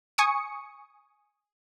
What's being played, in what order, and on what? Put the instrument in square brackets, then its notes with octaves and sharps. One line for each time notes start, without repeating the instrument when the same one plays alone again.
[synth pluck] G#5 C#6 D#6 C#7